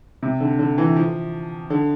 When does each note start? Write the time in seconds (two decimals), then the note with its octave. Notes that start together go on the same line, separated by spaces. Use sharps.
0.23 C3
0.40 D3
0.59 D3
0.78 E3
0.96 F3
1.70 D3